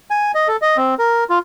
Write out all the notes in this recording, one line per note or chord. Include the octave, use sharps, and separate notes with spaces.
G#5
D#5
A4
D#5
C4
A#4
F4